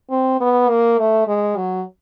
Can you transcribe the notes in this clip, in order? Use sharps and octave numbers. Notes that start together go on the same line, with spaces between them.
C4
B3
A#3
A3
G#3
F#3